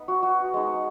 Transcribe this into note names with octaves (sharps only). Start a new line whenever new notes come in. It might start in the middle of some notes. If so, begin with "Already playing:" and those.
Already playing: B3 D#4
F#4
F#4
G#3 D#4